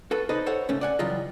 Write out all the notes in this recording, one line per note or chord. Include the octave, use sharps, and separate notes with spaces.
F#4 A4 B4
D#4 G4 A4 B4 C5 D#5
A4 C5 C#5 F#5
C#2 G#2 A3 C#4
D5 F#5 G#5
C#3 E3 F#3 G3 F4 D#5